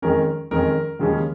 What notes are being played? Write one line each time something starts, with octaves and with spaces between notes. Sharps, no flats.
F2 D#3 G#3 C#4 A#4
F2 D#3 G#3 C#4 A#4
D#2 C#3 F3 G#3 C#4